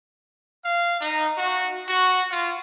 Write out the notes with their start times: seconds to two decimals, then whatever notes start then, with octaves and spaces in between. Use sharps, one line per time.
0.65 F5
1.01 D#4
1.38 F#4
1.88 F#4
2.32 F4